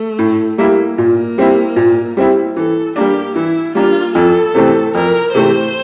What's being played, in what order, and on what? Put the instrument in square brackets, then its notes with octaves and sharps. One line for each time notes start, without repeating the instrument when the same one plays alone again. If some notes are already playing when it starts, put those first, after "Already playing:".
Already playing: [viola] A3
[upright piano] A2
G3 A#3 E4
[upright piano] A#2 [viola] A#3
[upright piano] G3 C4 E4
A#2
G3 C4 E4
[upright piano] E3 [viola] A4
[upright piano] G3 A#3 D4 [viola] G4
[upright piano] E3 [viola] E4
[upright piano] G3 A#3 D4 [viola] F4
[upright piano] F2 [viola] A4
[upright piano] C3 E3 A3 C4
[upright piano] F2 [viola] A#4
[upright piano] C3 E3 A3 C4 [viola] C5